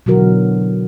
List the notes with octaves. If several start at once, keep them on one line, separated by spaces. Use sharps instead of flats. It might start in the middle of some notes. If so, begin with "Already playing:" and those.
B2 D3 E3 F#3 F#4 A#4